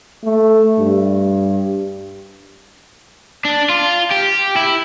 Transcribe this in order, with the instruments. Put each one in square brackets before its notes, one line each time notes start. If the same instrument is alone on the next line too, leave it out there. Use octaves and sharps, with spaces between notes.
[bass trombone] A3
G2
[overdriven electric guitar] D4
F4
G4
E4